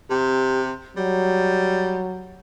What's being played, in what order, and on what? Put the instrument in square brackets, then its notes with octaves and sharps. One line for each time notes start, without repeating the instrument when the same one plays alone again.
[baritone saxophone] C3 [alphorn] G4
[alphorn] F#3 [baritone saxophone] G3